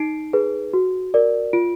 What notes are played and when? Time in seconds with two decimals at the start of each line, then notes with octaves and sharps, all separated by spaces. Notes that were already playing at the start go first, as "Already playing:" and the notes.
Already playing: D#4 C7 D7
0.33 G#4 B4
0.73 F#4
1.14 A#4 D5
1.53 F4 D7